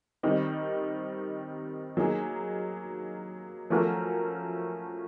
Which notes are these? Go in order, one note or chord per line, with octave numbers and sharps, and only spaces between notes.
D#3 G3 C4 D#4
F#3 A#3 D#4 G#4
F3 A3 C#4 F#4 A#4